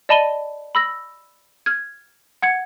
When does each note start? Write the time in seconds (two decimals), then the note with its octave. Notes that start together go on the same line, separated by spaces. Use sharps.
0.09 D5 D#5 A5 B5 D#7 G7
0.75 B5 E6 A#6
1.66 F6 G#6
2.42 F#5 G#6 C#7